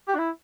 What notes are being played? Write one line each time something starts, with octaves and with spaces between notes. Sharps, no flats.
G4
D4
E4